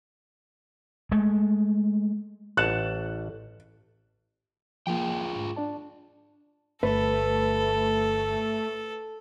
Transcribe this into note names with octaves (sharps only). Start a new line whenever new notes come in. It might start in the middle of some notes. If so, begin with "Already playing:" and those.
G#3 A3
A1 F#5 A5 F#6
F3 A#3 F4 G#4 G5
G#2
D4 D5 A5
G1 A3 A4 B4